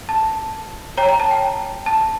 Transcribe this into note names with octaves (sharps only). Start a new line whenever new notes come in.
A5
C#5 G5 A#5
A#5
A5
G5
A5